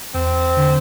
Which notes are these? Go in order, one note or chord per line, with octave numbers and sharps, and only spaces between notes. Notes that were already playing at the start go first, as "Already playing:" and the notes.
E2 C4
D3